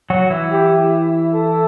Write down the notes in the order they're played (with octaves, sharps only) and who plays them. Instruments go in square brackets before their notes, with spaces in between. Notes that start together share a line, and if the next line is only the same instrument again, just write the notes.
[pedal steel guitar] F#3 F#4
E3 E4
[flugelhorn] G4
A4